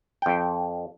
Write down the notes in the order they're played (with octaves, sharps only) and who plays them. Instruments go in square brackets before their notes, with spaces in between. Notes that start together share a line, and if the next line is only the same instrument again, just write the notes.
[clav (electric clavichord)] F2 G5